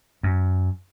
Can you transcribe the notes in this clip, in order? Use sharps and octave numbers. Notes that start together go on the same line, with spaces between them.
F#2